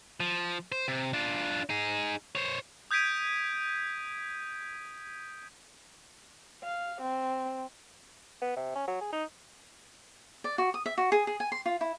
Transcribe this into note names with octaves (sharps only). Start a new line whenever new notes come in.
F3
C5
C3
D4 F4
D#4 G#4
C5 C#5
D#6 G6 G#6 B6 D7 D#7
F5
C4
B3
C3
C#4
F#3
G#4
D#4
D5
F#4
D#6
E5
F#4
G#4
G#4
G#5
C6
F4
E4